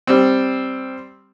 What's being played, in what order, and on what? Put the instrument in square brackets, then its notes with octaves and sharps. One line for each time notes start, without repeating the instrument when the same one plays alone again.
[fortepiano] G3 C4